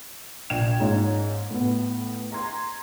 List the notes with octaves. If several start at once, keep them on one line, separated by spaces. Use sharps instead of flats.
A#1 G5 G#6 E7
G#2 A#3 C#4
A2 B3
A#5 C6 G#6